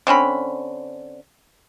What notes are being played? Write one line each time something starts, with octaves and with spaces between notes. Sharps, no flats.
D3 C4 C#4 B5